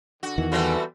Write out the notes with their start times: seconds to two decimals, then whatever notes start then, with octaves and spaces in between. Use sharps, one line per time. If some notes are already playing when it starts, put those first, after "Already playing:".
0.23 D3 F#4
0.38 E2 D#3 E3
0.52 E3 G3 B3 C4 F#4 A4